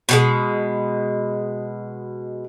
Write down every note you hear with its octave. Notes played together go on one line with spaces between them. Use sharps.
B2 G3 G#3